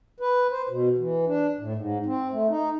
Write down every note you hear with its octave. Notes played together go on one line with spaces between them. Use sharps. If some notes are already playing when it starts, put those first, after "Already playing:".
B4
C5
B2
E3
D4
A2
G#2
C4
A3
D#4